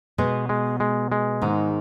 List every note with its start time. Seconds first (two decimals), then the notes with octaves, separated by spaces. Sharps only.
0.18 B2 G#3 B3
0.49 G#3
0.80 G#3
1.12 G#3
1.42 G#2 D#3 D#4